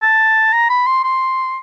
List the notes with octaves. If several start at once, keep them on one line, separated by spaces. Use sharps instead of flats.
A5
A#5
B5
C6
C6